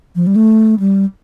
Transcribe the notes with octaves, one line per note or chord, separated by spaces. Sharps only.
F3
G3
A3
G3